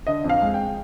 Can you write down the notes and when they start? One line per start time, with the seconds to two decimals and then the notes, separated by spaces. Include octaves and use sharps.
0.07 D3 D#5
0.24 F2
0.29 F5
0.42 G#3
0.54 G5